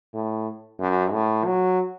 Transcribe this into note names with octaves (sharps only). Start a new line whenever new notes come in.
A2
F#2
A2
F#3